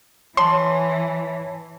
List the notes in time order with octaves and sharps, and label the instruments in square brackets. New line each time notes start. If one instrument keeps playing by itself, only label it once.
[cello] E3 [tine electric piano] C#5 A5 [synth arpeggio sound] C6